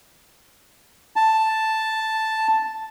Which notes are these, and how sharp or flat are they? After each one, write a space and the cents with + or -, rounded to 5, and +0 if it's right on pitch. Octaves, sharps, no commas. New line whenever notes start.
A5 +0